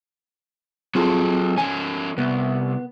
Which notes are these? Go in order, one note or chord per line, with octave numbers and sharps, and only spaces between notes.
F#3 C4 F4 G#4 A4
F3 C#4 G#5
C2 B3